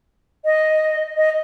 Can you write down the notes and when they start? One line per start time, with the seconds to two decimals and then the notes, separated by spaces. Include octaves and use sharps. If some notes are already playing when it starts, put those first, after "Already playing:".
0.45 D#5
1.17 D#5